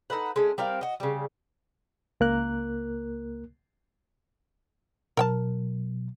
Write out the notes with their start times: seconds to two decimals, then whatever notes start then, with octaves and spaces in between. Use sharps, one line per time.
0.10 D#4 A4 B4 F#5
0.36 G#3 A3 C#4
0.58 G3 C4 A#4 F5
0.81 F#4 D#5
1.00 C#3 G3
2.20 C#2 A#3 A#4 F#6
5.17 B2 F#3 A#4 G5 A5